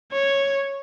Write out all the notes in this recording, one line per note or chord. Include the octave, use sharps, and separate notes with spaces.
C#5